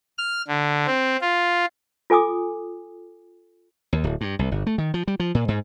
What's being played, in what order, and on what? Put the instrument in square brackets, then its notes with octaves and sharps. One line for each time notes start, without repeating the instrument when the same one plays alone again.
[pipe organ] F6
D3
C4
F4
[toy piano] F4 A4 G#5 D6 D#6
[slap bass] D#2
D1
G2
C2
G1
A3
D#3
F3
G3
F3
A#2
G#2